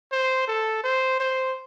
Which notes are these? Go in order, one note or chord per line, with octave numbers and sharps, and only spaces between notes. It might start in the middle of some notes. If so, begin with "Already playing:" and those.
C5
A4
C5
C5